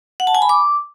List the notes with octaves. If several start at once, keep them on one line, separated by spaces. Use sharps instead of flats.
F#5
A5
G#5
B5
D6